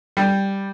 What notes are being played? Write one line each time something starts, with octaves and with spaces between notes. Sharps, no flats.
G3